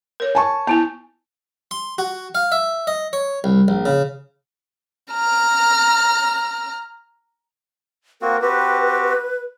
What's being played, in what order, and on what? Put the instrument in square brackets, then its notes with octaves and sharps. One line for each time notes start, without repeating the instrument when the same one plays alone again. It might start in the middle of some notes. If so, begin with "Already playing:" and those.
[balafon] A#4 C#5
[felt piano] G#5 A5 C#6
[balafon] B3 E4 G#5 [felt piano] A5
[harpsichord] C6
F#4
F5
E5
D#5
C#5
C2
A#1
C#3
[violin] A#5 F6
[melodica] A#3 C4 F#4 [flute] A#4
[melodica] C4 F#4 G4 [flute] B4